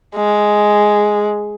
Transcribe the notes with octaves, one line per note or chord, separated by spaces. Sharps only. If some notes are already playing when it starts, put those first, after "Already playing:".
G#3